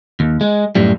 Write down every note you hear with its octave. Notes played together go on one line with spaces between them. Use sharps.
D#2
G#3
F#2 A2 G3